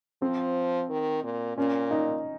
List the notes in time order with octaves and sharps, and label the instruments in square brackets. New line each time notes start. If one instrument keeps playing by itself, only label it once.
[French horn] F3 [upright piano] C4
[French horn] D#3
A#2
[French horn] A#2 [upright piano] C#4
[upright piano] D#4